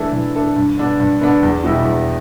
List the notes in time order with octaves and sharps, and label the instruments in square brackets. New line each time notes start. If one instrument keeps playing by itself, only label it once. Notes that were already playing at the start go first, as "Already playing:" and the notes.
Already playing: [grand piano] E3 A3 D4 A4
E3
A3 D4 A4
G2
D3 B3 D4
G2
D3 B3 D4
E2
B2 G3 E4 G4
E2